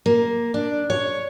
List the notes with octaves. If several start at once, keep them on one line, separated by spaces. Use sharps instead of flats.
A#3
D4
C#5